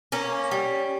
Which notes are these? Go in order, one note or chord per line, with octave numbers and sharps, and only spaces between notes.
A#3 C#4
G3